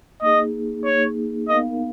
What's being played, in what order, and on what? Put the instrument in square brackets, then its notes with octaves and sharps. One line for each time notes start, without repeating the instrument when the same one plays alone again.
[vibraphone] A#3 D#4 G#4 [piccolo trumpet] D#5
[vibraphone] A#3 D#4 G#4 [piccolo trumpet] C#5
[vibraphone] B3 D#4 A#4 F5 [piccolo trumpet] D#5